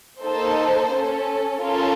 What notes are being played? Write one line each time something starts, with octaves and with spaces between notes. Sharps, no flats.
A#3 D#4 A4 C5
C#4 A4
C#4 F4 A4 A#4 C#5